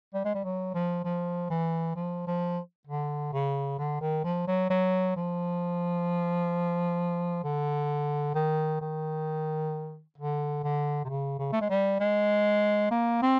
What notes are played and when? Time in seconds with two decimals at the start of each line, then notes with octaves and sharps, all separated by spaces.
0.14 G3
0.25 G#3
0.34 G3
0.44 F#3
0.75 F3
1.05 F3
1.50 E3
1.96 F3
2.27 F3
2.87 D3
3.33 C#3
3.79 D3
4.01 D#3
4.24 F3
4.47 F#3
4.70 F#3
5.16 F3
7.44 D3
8.35 D#3
8.81 D#3
10.18 D3
10.63 D3
11.05 C3
11.09 C#3
11.39 C#3
11.53 A3
11.61 G#3
11.70 G3
12.00 G#3
12.91 A#3
13.22 C4